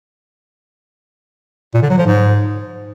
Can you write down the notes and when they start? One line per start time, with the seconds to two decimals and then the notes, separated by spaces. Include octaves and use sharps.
1.74 A#2
1.82 D3
1.90 F#3
1.98 F3
2.06 G#2